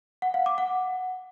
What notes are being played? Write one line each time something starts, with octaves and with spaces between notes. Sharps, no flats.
F#5
F5
D6
F#5